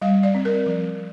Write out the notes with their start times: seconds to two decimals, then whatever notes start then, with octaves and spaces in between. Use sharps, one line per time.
0.02 G3 F5
0.23 D5
0.34 C4
0.45 A#4
0.67 F3